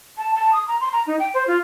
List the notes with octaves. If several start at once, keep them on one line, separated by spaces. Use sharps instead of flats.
A5
A5
D#6
A#5
C6
A#5
D#4
G5
C5
F4